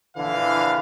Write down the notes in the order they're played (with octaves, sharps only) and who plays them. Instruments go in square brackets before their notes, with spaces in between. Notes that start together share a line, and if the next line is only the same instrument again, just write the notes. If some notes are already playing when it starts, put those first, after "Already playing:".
[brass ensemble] A#1 D3 E3 F5